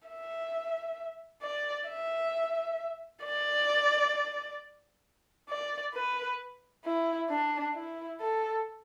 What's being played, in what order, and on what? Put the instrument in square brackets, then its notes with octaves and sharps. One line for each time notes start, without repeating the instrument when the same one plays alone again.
[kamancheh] E5
D5
E5
D5
D5
B4
E4
D4
E4
A4